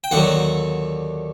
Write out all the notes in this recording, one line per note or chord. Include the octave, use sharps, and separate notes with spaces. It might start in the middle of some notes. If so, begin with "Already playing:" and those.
G5
D#2 D3 F#3 F#5